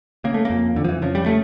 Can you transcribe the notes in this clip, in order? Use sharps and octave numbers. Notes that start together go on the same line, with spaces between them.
C#3 A#3
A3
F2 A#3
F2 D3
F3
E3
C#3 F3
G3
C#3 A3